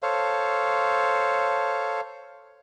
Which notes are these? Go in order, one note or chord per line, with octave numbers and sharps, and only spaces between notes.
A4 C5 C#5 F5